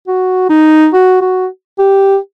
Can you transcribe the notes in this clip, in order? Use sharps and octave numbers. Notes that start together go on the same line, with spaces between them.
F#4
D#4
F#4
F#4
G4